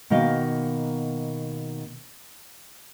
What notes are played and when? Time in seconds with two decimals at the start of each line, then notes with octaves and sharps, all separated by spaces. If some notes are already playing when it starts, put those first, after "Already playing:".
0.10 B2 D#3 A#3 D#5 F5